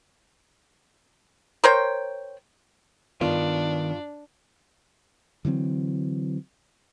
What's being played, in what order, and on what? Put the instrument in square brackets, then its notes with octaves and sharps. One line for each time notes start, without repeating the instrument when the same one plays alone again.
[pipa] A#4 C5 C#5 G5
[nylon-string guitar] G2 F4 [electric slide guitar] D#3 B3 A#4 [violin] D4
[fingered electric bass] D3 E3 F#3 C4